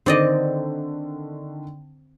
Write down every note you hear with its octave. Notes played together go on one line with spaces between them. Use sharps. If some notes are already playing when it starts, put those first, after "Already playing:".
D3 D#3 C4 D5 D#5